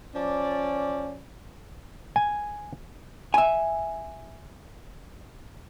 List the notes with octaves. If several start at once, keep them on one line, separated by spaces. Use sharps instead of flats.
F3 C#4 D5
G#5
E5 G#5